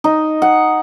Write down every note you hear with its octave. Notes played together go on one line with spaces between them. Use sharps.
D#4
F#5